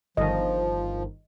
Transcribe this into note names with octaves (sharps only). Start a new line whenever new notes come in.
G1 D#3 F3 D#5